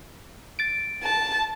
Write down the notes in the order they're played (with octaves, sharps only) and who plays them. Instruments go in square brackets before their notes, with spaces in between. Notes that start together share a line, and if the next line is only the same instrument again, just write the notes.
[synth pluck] A6 D7
[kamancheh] A5